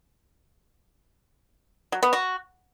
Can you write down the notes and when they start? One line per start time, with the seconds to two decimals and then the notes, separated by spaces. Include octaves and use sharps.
1.92 F#3
2.03 B3
2.13 F#4